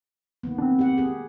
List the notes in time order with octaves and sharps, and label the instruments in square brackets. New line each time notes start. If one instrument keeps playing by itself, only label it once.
[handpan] D#3 A#3 B3
[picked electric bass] C4 D4
[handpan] G4 F#5
G4 G#4